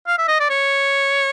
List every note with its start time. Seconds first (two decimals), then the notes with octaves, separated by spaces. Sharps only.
0.07 F5
0.18 E5
0.28 D#5
0.40 D5
0.50 C#5